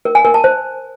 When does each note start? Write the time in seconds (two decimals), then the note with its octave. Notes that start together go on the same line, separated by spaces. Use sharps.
0.05 A#4
0.15 G#5
0.25 A#4
0.34 A5
0.44 C5